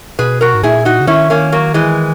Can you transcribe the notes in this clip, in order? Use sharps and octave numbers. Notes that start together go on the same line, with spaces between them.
B2 G#4 B4
F#4 A#4
G#2
A#2 E4 G#4
D#4 F#4
C#3
D#3 C#4 E4
A#3 C#4
F#3 A#3
E3 G#3